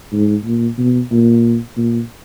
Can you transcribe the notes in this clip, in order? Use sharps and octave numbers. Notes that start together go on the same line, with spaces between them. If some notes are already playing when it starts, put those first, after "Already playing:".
G#2
A#2
B2
A#2
A#2